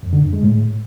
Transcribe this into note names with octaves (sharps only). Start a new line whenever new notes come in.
F2
D3
F2
G#3
A2